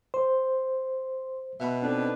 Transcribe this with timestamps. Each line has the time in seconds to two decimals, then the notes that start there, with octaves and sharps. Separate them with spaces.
0.14 C5 C6
1.60 B2 E5 F#5 B5
1.83 C4 D4 D#4 A4 B4